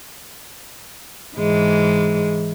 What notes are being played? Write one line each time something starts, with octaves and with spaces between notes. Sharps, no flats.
G#2 E3 G#3